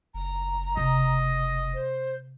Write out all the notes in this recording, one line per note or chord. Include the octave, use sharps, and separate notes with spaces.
F#1 A#5
C3 D#5
C5